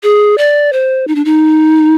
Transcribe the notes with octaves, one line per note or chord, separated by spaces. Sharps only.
G#4
D5
C5
D#4
D4
D#4